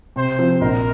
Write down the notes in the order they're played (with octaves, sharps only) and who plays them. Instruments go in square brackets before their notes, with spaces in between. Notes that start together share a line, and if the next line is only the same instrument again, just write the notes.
[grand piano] C3 [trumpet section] C5
[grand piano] F3 C4
[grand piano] A#1 [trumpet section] A#4